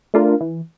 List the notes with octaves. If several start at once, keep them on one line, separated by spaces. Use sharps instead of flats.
A3 D4 F4 A#4
E3